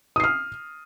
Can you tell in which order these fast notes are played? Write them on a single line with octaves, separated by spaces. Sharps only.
D#6 C7 F6